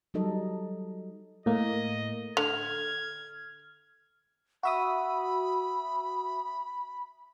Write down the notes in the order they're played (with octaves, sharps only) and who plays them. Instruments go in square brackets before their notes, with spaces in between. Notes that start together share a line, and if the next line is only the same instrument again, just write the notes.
[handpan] F#3 G3 D#4 A4 D#5
[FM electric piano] A2 A#3 [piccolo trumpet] D#5
[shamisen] D3 [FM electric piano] F6 [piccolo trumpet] G#6
[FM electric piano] F#4 E5 D#6 [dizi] B5